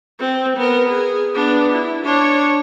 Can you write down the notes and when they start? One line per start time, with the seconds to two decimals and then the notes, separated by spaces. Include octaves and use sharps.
0.19 C4
0.57 B3 A#4
0.89 G#4
1.34 B3 D4
1.72 E4
2.05 D4 C#5